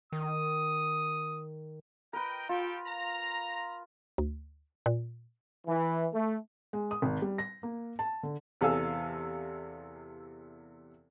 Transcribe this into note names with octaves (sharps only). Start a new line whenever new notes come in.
D#3 D#6
A#4 B4 D#5 G5
F4 G4 A4 G5
A#5
D2
A#2
E3
A3
G#3
D#6
G#1
G3
A#6
A#3
A5
D3
E2 C3 A4 F5 G#5 E6